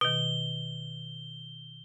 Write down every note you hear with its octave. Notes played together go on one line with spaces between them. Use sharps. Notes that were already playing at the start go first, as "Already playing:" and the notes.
B2 D#3 G7